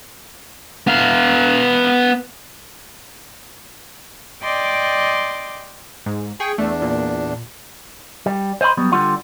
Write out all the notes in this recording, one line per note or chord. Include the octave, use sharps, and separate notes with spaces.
B3 F5
D5 D#5 G5 C6 D6
G#2
G#4 G5 C#6
E2 A3 D4
A#2
G3
C5 D#5 G5 B5 C6
F#3 G3 B3
D3 G3 F4 F#5